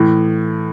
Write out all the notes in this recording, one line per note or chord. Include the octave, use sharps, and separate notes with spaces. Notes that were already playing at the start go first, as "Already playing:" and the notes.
Already playing: A2 E3